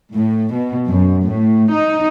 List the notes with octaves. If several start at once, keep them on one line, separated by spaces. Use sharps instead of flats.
A2
B2
F#2
A2
D#4